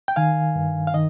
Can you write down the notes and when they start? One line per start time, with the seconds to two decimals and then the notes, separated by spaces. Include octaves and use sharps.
0.08 G5
0.16 D#3 F5 G#5
0.55 G2
0.87 F5
0.94 D#3 D#5